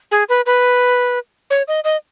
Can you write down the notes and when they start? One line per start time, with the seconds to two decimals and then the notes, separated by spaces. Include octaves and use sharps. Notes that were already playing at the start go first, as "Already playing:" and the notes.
0.11 G#4
0.29 B4
0.46 B4
1.50 C#5
1.68 D#5
1.84 D#5